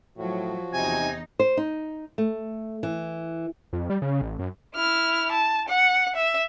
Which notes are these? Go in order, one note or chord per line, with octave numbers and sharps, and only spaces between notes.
A2 F3 F#3 F#4
E2 C3 D#4 G#5
C5
D#4
A3
E3
F2
G3
C#3
A1
F#2
E4 F6
A5
F#5
E5